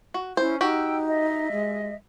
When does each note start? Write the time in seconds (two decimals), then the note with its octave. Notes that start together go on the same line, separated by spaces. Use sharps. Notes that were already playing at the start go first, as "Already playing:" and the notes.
0.14 F#4
0.37 C#4 E4 C5
0.61 D#4 F#4 G4 G5 E6
1.07 D#5 E5
1.52 G#3